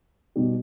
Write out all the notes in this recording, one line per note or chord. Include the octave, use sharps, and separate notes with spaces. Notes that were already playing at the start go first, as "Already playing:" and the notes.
B2 G3 D#4 G4